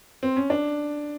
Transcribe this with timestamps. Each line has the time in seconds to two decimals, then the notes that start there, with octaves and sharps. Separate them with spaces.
0.23 C4
0.36 C#4
0.50 D4